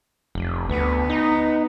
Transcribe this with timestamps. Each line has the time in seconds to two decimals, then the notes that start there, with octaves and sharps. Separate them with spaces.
0.35 F1
0.69 D2 B3
1.10 D#4